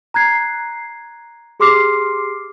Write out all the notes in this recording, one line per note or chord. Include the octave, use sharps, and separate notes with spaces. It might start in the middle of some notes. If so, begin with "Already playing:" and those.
A#5 F#6 G#6 C7
G4 G#4 C6 D6 F6 C7